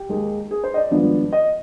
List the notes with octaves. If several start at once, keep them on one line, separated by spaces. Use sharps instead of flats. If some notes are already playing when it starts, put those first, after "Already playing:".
Already playing: G4
D#2 D#3 G#3
G#4
C5
D#5
D5
G#1 G2 F3 B3 D4
D#5